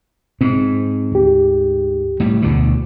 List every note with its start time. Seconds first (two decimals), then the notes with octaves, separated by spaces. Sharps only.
0.41 G#2 C4
1.12 D2 G4
2.20 A2 G3
2.42 D2 B2 D3